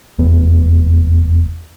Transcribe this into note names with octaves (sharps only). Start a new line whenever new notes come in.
F1 E2 B3